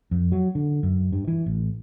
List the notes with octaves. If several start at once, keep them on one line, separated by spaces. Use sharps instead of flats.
F2
F#3
D3
F#2
G2
E3
A1